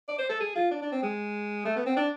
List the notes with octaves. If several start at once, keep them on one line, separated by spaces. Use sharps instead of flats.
D5
C5
A4
G#4
F4
D4
D4
C4
G#3
A3
B3
C4
D4